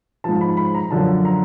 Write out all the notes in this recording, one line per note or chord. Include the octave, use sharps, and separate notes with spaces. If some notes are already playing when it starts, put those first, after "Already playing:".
G#2 F3 A5
B5
B5
A#5
F#2 D3 F3 A5
A#5